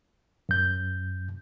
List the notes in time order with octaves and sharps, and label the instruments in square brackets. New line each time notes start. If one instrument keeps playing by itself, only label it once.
[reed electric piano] F#2 G6